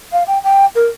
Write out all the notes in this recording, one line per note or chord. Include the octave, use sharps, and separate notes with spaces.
F5
G5
G5
A#4